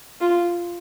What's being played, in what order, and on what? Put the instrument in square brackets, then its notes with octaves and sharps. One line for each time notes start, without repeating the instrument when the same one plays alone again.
[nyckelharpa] F4